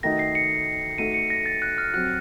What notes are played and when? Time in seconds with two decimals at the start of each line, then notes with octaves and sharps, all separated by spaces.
0.03 D#3 A3 D#4 F#4 A#6
0.19 C7
0.35 C#7
0.98 A3 D#4 F#4 A4 D#7
1.14 C#7
1.30 A#6
1.46 A6
1.62 F#6
1.78 F6
1.94 F#3 C4 F#4 F#6